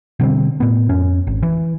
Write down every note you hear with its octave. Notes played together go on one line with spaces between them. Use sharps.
B2 D3 G3 C4
A2 B3
F2 C#4
G#1
E3